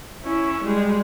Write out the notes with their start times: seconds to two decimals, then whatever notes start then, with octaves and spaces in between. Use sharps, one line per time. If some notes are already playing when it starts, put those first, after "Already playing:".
0.24 C#4 E4
0.65 G3 G#3